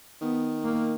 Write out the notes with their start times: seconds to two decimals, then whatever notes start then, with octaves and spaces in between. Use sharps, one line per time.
0.22 D#3 B3
0.64 A#3